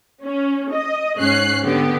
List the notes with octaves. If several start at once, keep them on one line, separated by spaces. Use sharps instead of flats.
C#4
D#5
G#2 C#4 F#6 C7
D3 B3 G4